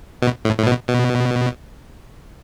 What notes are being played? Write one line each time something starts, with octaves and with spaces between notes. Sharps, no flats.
B2
A2
A2
B2
B2